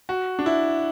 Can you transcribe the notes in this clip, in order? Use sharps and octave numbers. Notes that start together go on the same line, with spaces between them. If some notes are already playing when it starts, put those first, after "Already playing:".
F#4
D4
E4